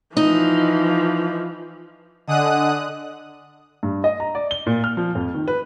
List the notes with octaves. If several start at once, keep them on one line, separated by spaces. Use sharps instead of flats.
E3 F3 D#4
D3 D#5 F#5 G#5 D#6 F#6
G2
D#5
A#5
D5
G7
A#2
F6
F3
F2
D#3
B4